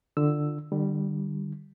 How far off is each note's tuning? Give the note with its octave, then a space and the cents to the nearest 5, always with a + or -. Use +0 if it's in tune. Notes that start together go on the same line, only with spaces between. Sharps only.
D3 +15 F4 -5 E6 +0
D3 +40 G3 +0